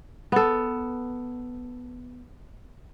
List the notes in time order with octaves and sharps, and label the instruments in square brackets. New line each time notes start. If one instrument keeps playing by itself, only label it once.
[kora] B3 A4